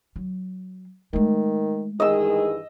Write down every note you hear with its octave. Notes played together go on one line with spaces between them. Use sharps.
F#3
D#3 G#3 A3
G2 D#3 E3 G#4 D#5 E6